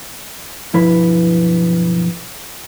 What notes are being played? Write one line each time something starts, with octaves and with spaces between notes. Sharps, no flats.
B1 G2 F3 E4 B4